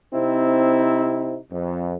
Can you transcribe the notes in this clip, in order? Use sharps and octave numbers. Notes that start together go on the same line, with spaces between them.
C3 C4 D#4 E4
F2